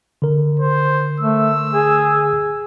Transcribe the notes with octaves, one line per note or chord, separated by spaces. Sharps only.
D3 A#4
C5
A3 E6
G#4